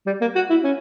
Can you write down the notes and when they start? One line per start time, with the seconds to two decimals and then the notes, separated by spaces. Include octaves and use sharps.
0.06 G3
0.21 A#3
0.35 F#4
0.50 E4
0.64 C#4